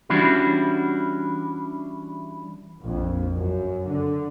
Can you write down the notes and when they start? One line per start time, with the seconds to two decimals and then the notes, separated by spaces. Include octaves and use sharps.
0.10 E3 G3 C#4 D4 E4 F#4
2.80 A#1 F2
3.36 F#2
3.86 D3